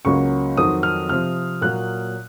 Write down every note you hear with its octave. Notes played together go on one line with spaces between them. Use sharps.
C#2 C#3 F#3 A#3 C#4 C#6
F2 D#3 F#3 C4 D#6
F6
C3 F3 C4 F6
A#2 F#3 A#3 F#6